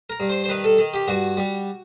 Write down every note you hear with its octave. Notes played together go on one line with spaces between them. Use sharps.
A#4
G2
C5
C5
D#3 B4
A4
D#3
G4
G2 F#4
G3